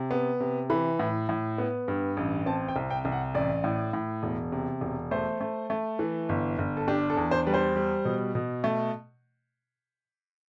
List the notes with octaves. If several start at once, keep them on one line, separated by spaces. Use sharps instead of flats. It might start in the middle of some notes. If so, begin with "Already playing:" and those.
Already playing: C3
B3
C3
E3 B5
A2
A2
B3
G2
A1
C4 A5
G5
C2
G5
C2
F#5
A1 D5
A2
A2
E1
C3
E1
A3 C5
A3
A3
E3
G1
G1
A4
D4 G4
A4
E2
C5
G3 B4
C5
G3
B2
B2
A3